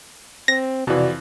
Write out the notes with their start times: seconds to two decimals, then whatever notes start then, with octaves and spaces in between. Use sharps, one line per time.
0.48 C4 A#6
0.87 F2 C3 E3 F#4 D5